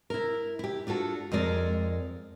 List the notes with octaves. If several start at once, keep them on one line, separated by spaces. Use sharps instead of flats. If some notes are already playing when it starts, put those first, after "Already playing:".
E4 A#4
E4 G4
D4 F4 F#4 A4
F2 G#3 A#4 D5